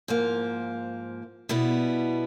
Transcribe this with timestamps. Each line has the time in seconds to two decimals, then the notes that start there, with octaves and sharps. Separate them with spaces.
0.08 G#2 F3 A#3
1.49 B2 G3 B3 E4